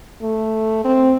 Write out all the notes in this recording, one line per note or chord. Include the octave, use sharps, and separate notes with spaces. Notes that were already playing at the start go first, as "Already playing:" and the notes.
A3
C4